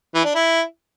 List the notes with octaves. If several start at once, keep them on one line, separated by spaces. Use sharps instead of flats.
E3
D4
E4